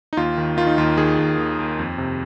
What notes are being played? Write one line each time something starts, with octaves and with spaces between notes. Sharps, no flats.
D#4
D#2 F4
D#3
D#3 F4
D#4
D#2 F4
D#3 G#4
D#2
D#2
D#2
F2
C3